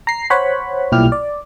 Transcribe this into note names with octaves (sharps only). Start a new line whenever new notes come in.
A#5 C7
C5 C#5 F#5 B5
B1 A#2 G3 E4 G4 F6
D5